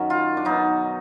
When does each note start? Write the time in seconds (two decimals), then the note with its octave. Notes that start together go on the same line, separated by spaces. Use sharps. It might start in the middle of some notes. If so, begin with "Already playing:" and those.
Already playing: F#2 D#3 F#3
0.10 F4
0.37 D4
0.45 B2 F#3 D#4